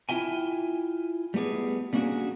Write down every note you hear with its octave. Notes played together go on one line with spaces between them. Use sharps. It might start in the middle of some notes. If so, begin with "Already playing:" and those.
E4 F4 E5 G5 G#5
G3 A3 B3 G4 G#4
G3 A#3 C#4 D4 F#4 G#4